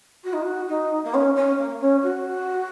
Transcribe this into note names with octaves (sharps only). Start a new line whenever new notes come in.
F#4
D#4
F#4
D#4
A#3
C#4
C#4
A#3
C#4
F#4